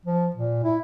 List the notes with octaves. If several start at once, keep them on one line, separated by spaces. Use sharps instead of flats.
F3
A#2
E4